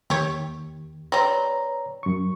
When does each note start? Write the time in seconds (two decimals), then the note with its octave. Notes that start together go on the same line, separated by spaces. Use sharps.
0.10 D#2 G4 C#5
1.12 G3 C4 B4 C#5 A#5
2.03 F#2 C#6